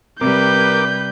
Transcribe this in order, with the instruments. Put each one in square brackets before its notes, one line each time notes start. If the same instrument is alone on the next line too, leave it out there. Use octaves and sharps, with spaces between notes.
[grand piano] C3 [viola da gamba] G3 B4 [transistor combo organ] A#4 D6 [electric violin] G6